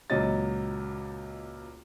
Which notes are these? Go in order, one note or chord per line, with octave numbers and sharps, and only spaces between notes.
C#2 A#2 F#3 D#5 A6